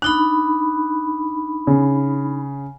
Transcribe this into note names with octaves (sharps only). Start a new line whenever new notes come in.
D4 D#4 B5 F#6
C#3